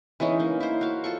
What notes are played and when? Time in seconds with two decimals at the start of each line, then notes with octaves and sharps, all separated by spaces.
0.20 E3 G#3 C#4 D#4
0.40 A#3
0.60 E4 C5
0.81 F#4 F5
1.04 F4 A4 C#6